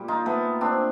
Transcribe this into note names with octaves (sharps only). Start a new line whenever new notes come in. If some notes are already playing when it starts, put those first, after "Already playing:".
Already playing: A#2 G3
D#4 F4
A3 B3
C4 D4